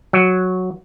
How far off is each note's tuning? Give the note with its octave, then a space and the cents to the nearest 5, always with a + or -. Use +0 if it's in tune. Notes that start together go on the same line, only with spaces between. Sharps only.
F#3 -5